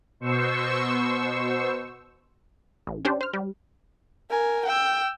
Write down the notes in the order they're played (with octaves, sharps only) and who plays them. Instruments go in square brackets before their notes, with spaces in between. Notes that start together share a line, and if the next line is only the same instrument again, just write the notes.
[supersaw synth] B2 C5 C#6 E6
[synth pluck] A1
C#4 D4 G4 C5
C5 F6
G3
[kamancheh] A#4 G#5
G5 E6